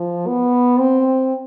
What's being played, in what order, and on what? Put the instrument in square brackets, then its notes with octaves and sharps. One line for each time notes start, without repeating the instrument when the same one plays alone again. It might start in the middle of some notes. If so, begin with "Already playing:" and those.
Already playing: [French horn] F3
B3
C4